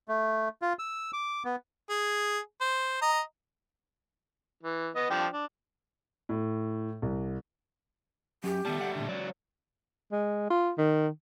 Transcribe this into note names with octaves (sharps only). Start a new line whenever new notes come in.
A3
F4
E6
D6
B3
G#4
C5
D#5 A#5
E3
B3 D#5
F3 D4 G5
D4
A2
C2
F#3 C#4 G4
D#3 G3 A3 B3 A5
D5 F#5
A#2 D3
C#2 F#3 D5
G#3
F4
D#3